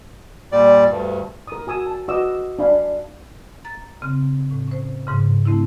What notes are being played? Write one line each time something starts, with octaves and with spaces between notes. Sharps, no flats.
A#2 G3 D5
D2 G2
A#4 D#6
F#4 G#5 D#6 E6
A5
F#4 B4 D#5 D6 E6
D4 E5 F5 G#5 B5
A#5 A6
C#3 C4
A2
C#4 C5
G#2 C#3
A3 C4 D4 E4